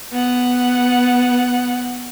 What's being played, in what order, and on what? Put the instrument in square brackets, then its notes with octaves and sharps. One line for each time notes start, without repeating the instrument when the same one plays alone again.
[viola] B3 F#5